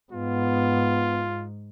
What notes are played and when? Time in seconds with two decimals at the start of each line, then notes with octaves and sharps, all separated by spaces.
0.12 G#2 B3 F4